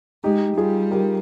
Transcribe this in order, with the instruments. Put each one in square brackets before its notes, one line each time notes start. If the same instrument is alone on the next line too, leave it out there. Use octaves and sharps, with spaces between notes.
[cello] G#3 [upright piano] D#4 G4
[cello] G3 [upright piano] F4 G#4
[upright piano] G4 A#4